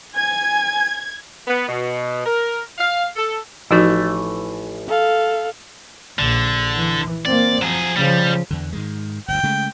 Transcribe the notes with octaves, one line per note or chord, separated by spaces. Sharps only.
G#5 G#6
B3
B2
A#4
F5
A4
A1 E3 F3 A3 D#4 F#4
A4 F5
A#1 D3
E3
A#3 C4 D5
F3 F#3 G#4
C#3 F3 G3
E2 D3
G#2 D#3 G#3
G1 D2 G5
C#3 G#3 A3